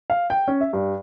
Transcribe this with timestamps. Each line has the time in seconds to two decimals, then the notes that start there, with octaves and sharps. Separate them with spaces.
0.10 F5
0.30 G5
0.48 C#4
0.61 E5
0.73 G2